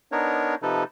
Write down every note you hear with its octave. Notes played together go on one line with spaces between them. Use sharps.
B3 D4 D#4 A#4 C#5
C3 F3 D#4 A4 B4